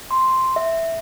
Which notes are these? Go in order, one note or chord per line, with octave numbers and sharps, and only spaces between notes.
C6
E5